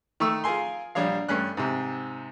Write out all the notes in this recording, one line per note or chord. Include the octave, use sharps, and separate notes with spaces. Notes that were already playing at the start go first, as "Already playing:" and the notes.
D#3 A3 C#6 E6
F4 G#4 A#4 G#5 C6
A#1 G3 D4 C#5 F5
G2 A3 C#4 F#6
G#2 C3